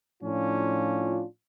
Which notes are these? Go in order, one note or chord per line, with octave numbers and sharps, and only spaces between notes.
A2 F3 C#4 D4 F4